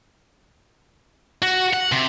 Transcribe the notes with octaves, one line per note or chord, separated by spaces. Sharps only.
F#4
F#5
C3